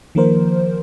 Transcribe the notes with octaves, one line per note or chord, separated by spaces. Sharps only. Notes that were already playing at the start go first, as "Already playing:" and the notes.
D#3 F3 A#3 A#4 C5